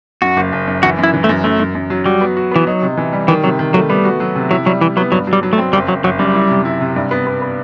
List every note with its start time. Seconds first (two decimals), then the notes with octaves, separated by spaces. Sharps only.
0.22 F#2 F#4
0.37 F#1
0.53 F#1
0.68 F#2
0.83 E3 F#4
0.99 F#2 E4
1.14 E3
1.24 A3
1.29 F#2
1.44 F#2 A3
1.59 F#2
1.75 F#2
1.90 F#3
2.05 G3 F#4
2.21 B3
2.37 F#4
2.51 E3 B3
2.67 F#3 D#4
2.82 C3
2.97 E3
3.13 G3
3.28 D#3 E3
3.44 C3 F#3
3.59 D#3
3.74 F#3 A3
3.89 G3 B3
4.05 F#4
4.20 F#3
4.35 C3
4.51 F#3 E4
4.66 F#3 G3
4.81 E3 E4
4.97 F#3 B3
5.12 G2 F#3
5.27 F#3
5.33 G3
5.43 F#3
5.53 A3
5.58 C4
5.73 F#1 G3
5.88 F#1 F#3
6.04 F#1 F#3
6.19 F#2 G3
6.35 E4
6.50 C3
6.65 E4
6.81 C3
6.96 G2
7.11 B3
7.27 B3
7.42 B3